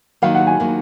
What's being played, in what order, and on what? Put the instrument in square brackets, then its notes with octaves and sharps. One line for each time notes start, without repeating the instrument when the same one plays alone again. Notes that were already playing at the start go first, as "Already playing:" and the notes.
[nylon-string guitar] D#3 F#3 A#3 [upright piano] F5
[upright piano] F#5
G#5
[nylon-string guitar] D#3 F#3 A#3